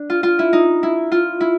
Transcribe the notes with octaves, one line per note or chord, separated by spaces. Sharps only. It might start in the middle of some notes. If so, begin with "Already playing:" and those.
Already playing: D4
F4
F4
E4
D#4
E4
F4
E4